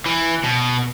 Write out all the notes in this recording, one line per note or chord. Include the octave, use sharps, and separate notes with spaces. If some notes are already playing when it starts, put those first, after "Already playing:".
E3
B2